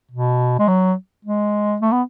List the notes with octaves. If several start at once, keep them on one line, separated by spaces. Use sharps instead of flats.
B2
G#3
F#3
G#3
A3
B3